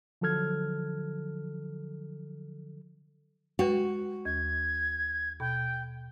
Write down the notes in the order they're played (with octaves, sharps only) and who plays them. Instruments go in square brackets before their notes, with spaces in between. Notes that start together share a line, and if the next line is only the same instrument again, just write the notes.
[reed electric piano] D3 F3 F#3 A4 F6 G#6
[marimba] G#3 B4 G5 [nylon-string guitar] F#4
[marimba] D#2 [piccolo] G#6
[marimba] B2 [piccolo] G5